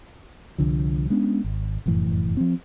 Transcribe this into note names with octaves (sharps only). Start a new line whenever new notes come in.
C2 D3 F3
G#3 B3 C#4 D4
G#1
F1 F#2 A2 E3
F3 C4